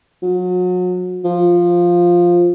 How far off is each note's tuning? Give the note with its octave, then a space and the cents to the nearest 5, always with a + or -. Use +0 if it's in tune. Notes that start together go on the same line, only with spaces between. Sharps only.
F#3 -35
F3 +0